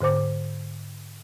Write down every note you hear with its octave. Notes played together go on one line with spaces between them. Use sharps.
G#2 D3 C5 D6